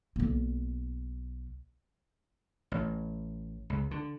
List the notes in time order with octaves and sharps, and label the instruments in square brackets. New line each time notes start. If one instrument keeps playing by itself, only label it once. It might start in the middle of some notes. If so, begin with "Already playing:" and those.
[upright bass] B1 A#3
[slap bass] A1
C#2
D3